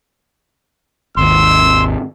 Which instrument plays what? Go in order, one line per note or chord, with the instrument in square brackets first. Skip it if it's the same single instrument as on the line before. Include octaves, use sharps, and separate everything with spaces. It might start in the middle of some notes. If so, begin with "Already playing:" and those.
[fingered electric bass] G#1 D#2 [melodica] C6 [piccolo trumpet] E6